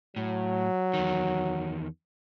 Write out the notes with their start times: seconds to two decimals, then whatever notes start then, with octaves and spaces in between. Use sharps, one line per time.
0.16 A2 F#3
0.94 E2 D#3